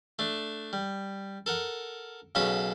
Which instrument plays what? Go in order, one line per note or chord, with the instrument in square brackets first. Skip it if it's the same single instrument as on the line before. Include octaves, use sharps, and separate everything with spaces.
[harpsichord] A3 D4
G3
A4 A#4 F#5
B1 C#3 C#4 F#4 A4 B5